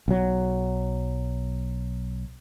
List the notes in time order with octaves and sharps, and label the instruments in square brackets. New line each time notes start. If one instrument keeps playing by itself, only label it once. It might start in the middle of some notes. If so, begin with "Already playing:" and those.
[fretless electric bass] B1 F#3